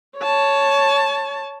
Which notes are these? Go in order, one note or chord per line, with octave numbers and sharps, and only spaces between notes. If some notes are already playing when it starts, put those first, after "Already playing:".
C#5 A5